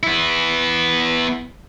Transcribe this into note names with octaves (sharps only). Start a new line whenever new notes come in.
B3 E4